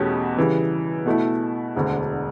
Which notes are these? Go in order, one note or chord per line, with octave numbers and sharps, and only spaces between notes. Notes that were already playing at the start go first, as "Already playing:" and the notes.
Already playing: E2 B2 A3 C#4 G4
C#3 E3 G3
B2 A3 E4
E1 D2 D3